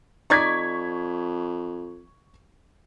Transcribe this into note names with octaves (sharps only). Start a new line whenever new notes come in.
F2 D#4 D5 C#6 G#6 B6